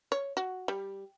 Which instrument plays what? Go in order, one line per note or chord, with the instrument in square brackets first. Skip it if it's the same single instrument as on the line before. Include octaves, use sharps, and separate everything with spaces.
[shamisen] C#5
F#4
G3